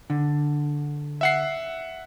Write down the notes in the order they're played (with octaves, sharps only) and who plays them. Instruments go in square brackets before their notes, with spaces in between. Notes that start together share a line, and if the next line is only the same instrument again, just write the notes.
[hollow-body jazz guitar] D3
[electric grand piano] E5 F#5 C7